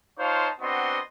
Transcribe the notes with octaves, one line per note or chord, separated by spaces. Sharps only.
D#4 F4 C5 C#5 F5 A5
B3 C4 D4 F#4 D#5 C6